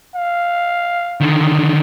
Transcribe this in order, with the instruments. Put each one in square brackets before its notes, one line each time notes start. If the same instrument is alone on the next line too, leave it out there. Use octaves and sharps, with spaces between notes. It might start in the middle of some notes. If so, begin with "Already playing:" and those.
[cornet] F5
[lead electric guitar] D3 D#3